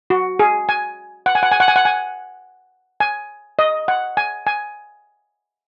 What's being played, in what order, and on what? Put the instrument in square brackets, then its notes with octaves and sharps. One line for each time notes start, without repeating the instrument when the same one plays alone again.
[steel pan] F#4
G#4
G#5
F#5
G#5
F#5
G#5
F#5
G#5
F#5
G#5
G#5
D#5
F#5
G#5
G#5